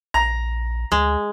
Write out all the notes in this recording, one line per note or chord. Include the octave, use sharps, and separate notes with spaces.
A#1 A#5
D2 G#3